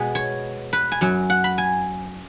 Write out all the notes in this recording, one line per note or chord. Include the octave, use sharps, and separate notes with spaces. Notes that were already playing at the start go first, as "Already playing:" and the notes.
Already playing: B2 G#3 B3
C#5
B4
G#5
F#2 F#3 C#4
F#5
B5
G#5